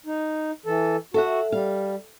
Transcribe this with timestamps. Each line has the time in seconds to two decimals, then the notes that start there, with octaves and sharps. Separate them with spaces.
0.06 D#4
0.66 E3 A4
1.14 F#4 A4 E5 F#5
1.52 G3 F5